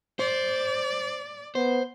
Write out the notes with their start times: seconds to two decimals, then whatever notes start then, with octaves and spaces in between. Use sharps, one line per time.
0.19 C5 D5
1.55 B3 C5